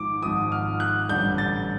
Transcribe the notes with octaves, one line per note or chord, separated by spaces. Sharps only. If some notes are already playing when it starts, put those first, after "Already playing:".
Already playing: G#1 G#2 F3 D6
G#1 G#2 F3 D#6
F6
F#6
A1 G2 D3 G3 G6
A6